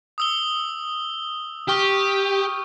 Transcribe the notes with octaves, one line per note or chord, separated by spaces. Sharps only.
D#6 E6 G7
G4 C#6 D#6 F6